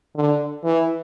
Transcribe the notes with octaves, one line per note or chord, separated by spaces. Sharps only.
D3
E3